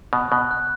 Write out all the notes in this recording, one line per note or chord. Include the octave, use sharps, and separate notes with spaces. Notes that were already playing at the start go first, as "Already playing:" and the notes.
B2 F#6
B2 F#6
F#6